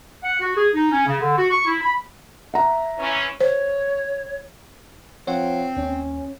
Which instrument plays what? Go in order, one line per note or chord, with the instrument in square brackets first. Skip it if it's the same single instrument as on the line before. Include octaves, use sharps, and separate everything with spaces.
[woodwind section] F#5
F#4
G#4
D#4
C#4
C#3
D3
F#4
C#6
E4
B5
[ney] E5 [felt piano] F#5 A#5
[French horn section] E3 C#4
[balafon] C5 [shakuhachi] C#5
[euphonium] F3 [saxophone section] C4 [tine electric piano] C#5 F#5
[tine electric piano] D#2 [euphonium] C#4